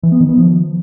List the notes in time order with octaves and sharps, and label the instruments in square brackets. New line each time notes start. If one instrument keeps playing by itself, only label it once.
[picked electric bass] E3
B3
D#3
B3
F3